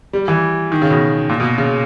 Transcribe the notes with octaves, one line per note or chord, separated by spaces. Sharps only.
G3
E3
D#3
C#3
B2
A#2
B2
C#3